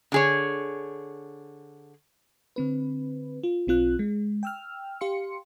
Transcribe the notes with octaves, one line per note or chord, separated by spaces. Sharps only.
D3 G#4 C#5
D3 C4 B4
F4
B1 C4 F4 F#6
G#3
G5 E6 F6
G4 F5 C6 C#7